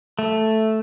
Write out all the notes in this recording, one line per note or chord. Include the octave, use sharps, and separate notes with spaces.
A3